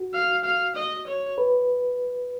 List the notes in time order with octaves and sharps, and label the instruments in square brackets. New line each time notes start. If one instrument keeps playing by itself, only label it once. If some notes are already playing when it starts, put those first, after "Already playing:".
Already playing: [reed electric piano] F#4
[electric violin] F5
F5
D#5
C#5
[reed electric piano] B4